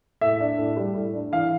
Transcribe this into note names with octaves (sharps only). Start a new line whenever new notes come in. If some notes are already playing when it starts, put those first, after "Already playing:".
A2 E5
D4
A2
G3
A2
D4
E3 F5